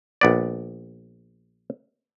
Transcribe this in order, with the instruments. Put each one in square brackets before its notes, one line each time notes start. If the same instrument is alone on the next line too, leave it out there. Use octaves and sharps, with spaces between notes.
[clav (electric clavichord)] A#1 B3 D5